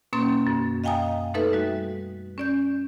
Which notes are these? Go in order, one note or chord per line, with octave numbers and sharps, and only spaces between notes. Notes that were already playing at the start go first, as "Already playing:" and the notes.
B2 A#3 C#4 C6 A6
F#2
D#5 F5 G5 G#5 A#5 D#6
A3 D#4 A4 B4 E5
G3 F#4
C#4 D5 G6